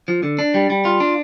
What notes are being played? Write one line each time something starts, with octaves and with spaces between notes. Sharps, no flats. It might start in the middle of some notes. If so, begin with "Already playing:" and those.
F3
D3
D4
G3
G3
F4
D4